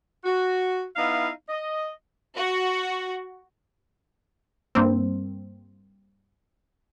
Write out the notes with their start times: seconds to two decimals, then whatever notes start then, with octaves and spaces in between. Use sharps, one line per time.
0.24 F#4
0.96 B3 D#4 E4 F5
1.49 D#5
2.37 F#4
4.75 G2 A#3 C4